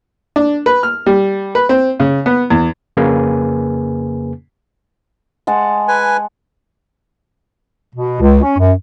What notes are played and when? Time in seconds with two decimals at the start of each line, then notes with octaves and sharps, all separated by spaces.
0.36 D4
0.66 B4
0.83 F6
1.06 G3
1.55 B4
1.69 C4
2.00 C#3
2.26 B3
2.50 E2
2.97 F2 C#3 A#3 G#4 B4 G#5
5.47 G#3 F#5 A5
5.88 B4 G#5
7.95 B2
8.21 C#2
8.42 C#4
8.58 F#2